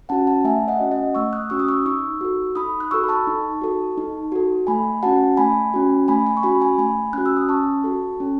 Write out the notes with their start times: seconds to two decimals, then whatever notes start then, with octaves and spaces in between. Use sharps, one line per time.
0.09 C#4 F#4 F#5 A5
0.27 F#5 A5
0.44 A3 E5 G#5
0.68 D#5 F#5
0.80 C#4 F#4
0.91 D#5 F#5
1.15 A3 C#6 E6
1.32 D#6 F#6
1.50 C#4 F#4 C#6 E6
1.59 D#6
1.68 C#6 E6
1.86 D#4 C#6 E6
2.21 F#4 A4
2.55 D#4 B5 D#6
2.80 F#6
2.91 F#4 A4 C#6 E6
3.04 B5
3.09 A5 C#6
3.27 D#4
3.61 F#4 A4
3.98 D#4
4.32 F#4 A4
4.67 A3 G#5 B5
5.03 C#4 F#4 F#5 A5
5.37 A3 G#5 B5
5.74 C#4 F#4
6.08 A3 G#5 B5
6.26 G#5 B5
6.37 C#6
6.43 C#4 F#4 G#5 B5
6.61 G#5 B5
6.78 A3 G#5 B5
7.13 C#4 F#4 F#6
7.26 E6
7.37 D#6
7.49 C#4 A5 C#6
7.84 F#4 A4
8.20 C#4